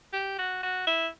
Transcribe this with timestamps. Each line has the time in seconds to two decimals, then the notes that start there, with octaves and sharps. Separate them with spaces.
0.13 G4
0.38 F#4
0.63 F#4
0.87 E4